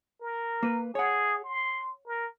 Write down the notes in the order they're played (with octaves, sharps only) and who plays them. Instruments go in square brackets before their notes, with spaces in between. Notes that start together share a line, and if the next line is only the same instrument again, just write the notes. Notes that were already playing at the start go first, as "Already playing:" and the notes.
[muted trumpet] A#4
[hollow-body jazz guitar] A#3 B4
[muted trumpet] G#4 [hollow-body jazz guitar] C#5 F#5
[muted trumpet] C6
A#4